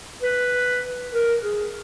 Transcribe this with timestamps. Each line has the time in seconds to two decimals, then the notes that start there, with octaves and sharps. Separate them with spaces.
0.22 B4
1.13 A#4
1.43 G#4